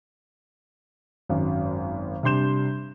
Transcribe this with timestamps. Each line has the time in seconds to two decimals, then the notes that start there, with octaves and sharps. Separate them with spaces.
1.29 G#1 F#2
2.23 C3 G3 D4 C6 G6 E7